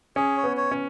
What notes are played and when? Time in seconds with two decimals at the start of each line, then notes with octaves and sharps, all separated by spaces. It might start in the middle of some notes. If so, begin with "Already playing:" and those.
0.16 C#4 G#4
0.37 C#5
0.43 B3
0.57 C#5
0.71 C#4